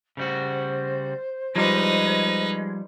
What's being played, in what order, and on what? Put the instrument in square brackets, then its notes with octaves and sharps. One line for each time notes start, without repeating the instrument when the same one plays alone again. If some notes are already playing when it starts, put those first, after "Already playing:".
[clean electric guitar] C#3 G3 F#4 [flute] C5
[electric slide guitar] F3 G3 [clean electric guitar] G#3 [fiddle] D#4 B4